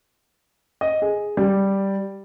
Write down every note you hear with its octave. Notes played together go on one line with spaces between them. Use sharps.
D#5
G#4
G3